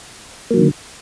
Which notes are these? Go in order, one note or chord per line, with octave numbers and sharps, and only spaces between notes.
D3 D#3 F#3 A#3